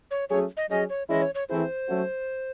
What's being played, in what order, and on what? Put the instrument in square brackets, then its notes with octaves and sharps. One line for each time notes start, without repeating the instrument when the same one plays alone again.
[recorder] C#5
[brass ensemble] F#3 A3 C#4 G#4 [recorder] C#5
[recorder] D#5
[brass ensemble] F#3 C#4 G#4 [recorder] D#5
[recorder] C#5
[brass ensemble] E3 G#3 C#4 E4 G#4 [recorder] D#5
[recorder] C#5
C#5
[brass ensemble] E3 A3 C4 E4 G#4 [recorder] C5
[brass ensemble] F#3 A3 C#4 F#4